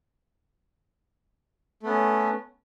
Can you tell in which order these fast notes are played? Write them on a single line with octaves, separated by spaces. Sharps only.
A3 B3 C#4